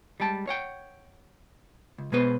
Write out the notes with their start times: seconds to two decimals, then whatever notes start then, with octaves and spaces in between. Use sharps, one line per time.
0.20 G3 G#3 G5 A5
0.47 C#5 F#5 G5
1.98 C#2
2.12 B2 G#3 B3 B4 C5